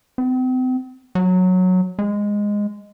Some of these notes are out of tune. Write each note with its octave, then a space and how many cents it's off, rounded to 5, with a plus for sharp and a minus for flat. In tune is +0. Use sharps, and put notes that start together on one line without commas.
C4 -40
F#3 -10
G#3 -10